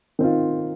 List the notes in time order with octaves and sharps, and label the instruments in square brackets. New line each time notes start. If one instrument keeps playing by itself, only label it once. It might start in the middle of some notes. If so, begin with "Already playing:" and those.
[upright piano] D#3 C4 F4